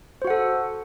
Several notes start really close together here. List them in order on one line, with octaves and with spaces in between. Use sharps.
C5 F#4 F#5 A4